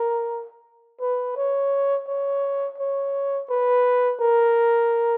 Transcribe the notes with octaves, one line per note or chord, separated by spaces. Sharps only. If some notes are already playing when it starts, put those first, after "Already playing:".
Already playing: A#4
B4
C#5
C#5
C#5
B4
A#4